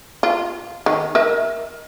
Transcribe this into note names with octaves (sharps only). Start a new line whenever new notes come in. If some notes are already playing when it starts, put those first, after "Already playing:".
F4
D#3
A#4 D#5 E5